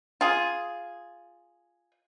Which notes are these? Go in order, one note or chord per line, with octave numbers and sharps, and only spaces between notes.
F4 G#4